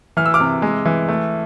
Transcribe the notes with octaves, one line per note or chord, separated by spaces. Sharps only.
E3 F6
E6
D6 F6
C3
G#3
E3
A3